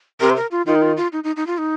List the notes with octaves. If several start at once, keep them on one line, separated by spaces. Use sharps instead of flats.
C3 A#4
C5
A#4
F4
D#3 F4
D#4
F4
F4
D#4
D#4
D#4
F4
D#4